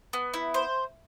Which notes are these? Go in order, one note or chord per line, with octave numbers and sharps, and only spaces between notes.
B3
E4
C5